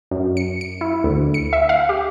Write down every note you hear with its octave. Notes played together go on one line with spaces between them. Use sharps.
F#2
C#7
C#7
E4
D2
C#7
E5
F5
G4